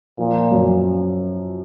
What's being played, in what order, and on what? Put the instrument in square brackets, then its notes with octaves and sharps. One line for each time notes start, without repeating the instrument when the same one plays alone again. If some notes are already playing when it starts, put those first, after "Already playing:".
[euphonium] A#2 [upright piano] F3
[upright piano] F#2